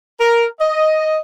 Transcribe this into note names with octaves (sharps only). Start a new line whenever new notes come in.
A#4
D#5